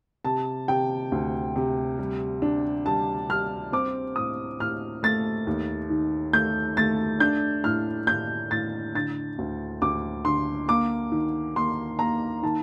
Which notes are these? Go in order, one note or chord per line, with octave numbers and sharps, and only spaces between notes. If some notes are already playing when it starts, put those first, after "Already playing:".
C3 A5
C3 G5
D2
C3
G3
D4
G3 A5
G3 F6
C4 D6
A2 D#6
A2 F6
A3 A6
D#2
D#3
A3 G6
A3 A6
D4 G6
A2 F6
A2 G6
A2 A6
D3 A6
D2
D2 D6
D3 C6
A#3 D6
D#3
A#3 C6
A#3 A#5
D#3 A5